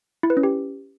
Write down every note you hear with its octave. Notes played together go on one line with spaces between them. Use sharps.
E4
B4
C#4
G4